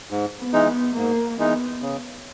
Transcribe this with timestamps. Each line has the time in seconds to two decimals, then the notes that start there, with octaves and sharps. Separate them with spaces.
0.11 G#2
0.39 B3
0.53 E3 G#3 D#4
0.68 B3
0.96 G#2 A#3
1.38 E3 G#3 B3 D#4
1.82 C#3